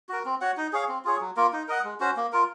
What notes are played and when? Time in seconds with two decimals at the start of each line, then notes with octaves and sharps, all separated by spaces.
0.09 F#4 A#4
0.25 C4
0.41 F#4 C#5 F#5
0.57 D#4
0.73 G#4 C#5 F5
0.89 C4
1.05 F4 G#4 C#5
1.21 F#3
1.37 A#3 F4 A#4
1.53 D#4
1.68 A#4 D#5 F#5
1.84 G#3
2.00 C#4 F#4 C5
2.17 A#3
2.32 F4 A#4